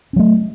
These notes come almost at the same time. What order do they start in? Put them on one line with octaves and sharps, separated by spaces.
C#4 F#3 A3